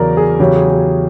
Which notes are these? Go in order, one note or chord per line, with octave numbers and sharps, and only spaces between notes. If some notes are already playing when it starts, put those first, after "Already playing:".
Already playing: E2 C#3 F#3 A#4 D5
G#4
E2 C#3 F#3 G4
G#4
G4